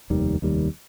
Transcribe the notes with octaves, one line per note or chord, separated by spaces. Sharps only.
F1 D#2 D#3 G3
F1 D#2 D#3 G3